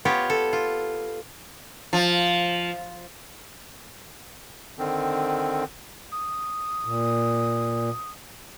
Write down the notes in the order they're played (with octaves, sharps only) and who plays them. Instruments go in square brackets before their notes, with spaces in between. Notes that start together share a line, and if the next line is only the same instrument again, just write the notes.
[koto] B3 F4 G4 C#5
A4
F4
[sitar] F3
[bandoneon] D3 D#3 C4
[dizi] D#6
[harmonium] A#2